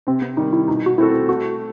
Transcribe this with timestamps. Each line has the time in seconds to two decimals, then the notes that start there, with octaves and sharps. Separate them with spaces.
0.07 C3 C4
0.22 B3
0.37 D#3 G3 D#4
0.53 E4
0.68 B2 D#4
0.86 F#4
0.98 A3 C4 E4 F#4 A4
1.29 A3 F#4